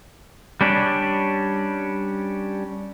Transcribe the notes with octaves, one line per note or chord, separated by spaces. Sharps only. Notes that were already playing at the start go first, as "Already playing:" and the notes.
G3 C#4 D4